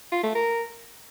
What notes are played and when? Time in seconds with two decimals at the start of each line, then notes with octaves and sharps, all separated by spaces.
0.12 F4
0.23 A3
0.35 A#4